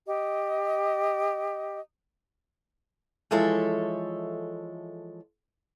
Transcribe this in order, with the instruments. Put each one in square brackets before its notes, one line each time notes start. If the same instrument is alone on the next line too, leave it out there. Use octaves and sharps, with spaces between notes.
[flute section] G4 D#5
[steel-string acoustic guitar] E3 F3 G#3 A4 C#5 E5